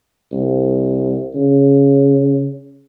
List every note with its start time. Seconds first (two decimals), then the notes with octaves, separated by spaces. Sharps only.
0.32 C2
1.35 C#3